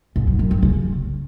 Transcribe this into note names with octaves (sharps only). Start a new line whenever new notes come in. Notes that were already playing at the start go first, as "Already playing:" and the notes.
G#2
F#3
F#2
G2
C#3